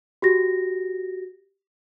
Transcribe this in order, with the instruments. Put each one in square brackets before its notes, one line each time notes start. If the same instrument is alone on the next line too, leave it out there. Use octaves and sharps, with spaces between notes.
[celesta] F#4 G4 A#6